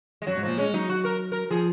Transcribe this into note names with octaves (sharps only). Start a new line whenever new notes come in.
G#3
F#2 F#3
G#2
A#2 F3
G#3 C#4
F#3 D#4
F#4
A#4
A#4
F3 G#4